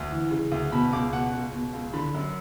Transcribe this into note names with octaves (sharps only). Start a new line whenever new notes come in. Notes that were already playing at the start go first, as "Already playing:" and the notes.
Already playing: D2
E3
C#3
D2
B2 B5
C#2 D6
B2 F#5
C#2
B2
C#2
D3 B5
F#2